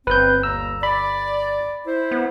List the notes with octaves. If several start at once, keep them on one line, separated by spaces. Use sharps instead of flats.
G1 C4 B4 G6
D#2 G3 A#5 E6
D5 B5
E4 C5
B3